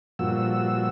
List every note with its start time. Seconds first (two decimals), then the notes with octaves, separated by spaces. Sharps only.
0.19 G2 A#2 F3 F#4 E6